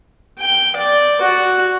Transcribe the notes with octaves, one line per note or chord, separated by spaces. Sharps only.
G5
D5
F#4